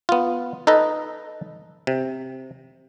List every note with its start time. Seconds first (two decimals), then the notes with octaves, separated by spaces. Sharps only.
0.09 B3 F4
0.67 D#4 A4 B4 D#5
1.87 C3